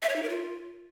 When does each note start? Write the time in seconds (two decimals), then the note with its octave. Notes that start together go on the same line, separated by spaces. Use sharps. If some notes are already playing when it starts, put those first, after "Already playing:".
0.02 E5
0.09 C#5
0.16 D#4
0.23 A#4
0.29 F4